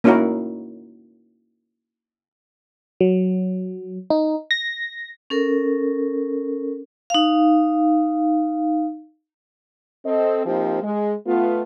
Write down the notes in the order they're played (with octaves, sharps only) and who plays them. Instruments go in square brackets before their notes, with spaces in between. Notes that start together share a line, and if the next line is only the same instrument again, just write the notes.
[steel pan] A#3 C#4 D#4 E4 F#4 A#4
[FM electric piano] F#3
D#4
A#6
[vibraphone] C#4 A4 A#4
D#4 F5
[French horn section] C4 A4 D#5
F3 A#3 C4 D#4 G4
G#3
A3 B3 F4